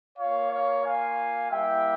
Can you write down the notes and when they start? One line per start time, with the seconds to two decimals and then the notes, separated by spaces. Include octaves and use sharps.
0.18 A#3 F4 C#5 F5
0.51 C#5 F5
0.84 F5 G#5
1.50 G3 A#3 E4 G4 E5 G5